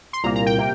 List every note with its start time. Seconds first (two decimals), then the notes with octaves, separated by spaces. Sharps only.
0.13 C6
0.24 C2 A#2 A#3 A#5
0.36 A#5
0.46 G5
0.58 C3 A#3